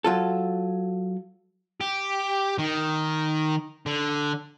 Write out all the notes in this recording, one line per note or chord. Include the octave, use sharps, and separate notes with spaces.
F#3 F4 A4
G4
D#3
D3